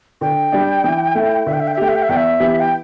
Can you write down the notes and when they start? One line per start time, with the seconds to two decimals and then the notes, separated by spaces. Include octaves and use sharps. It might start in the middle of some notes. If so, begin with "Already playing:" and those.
0.21 D3 G5
0.52 G3 D4
0.84 E3
1.15 A3 E4
1.46 D3 E5
1.53 G5
1.60 E5
1.67 G5
1.74 E5
1.77 A3 G4 G5
1.89 E5
1.96 G5
2.03 E5
2.09 E2 G5
2.17 E5
2.40 E3 B3 G4
2.60 G5